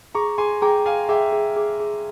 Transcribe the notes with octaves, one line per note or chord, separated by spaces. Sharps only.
G#4 A#5 C#6
G#4 G#5 C6
G#4 G5 A#5
G#4 F5 G#5
G#4 E5 G5
G#4
G#4
G#4